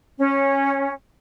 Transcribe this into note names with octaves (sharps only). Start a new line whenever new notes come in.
C#4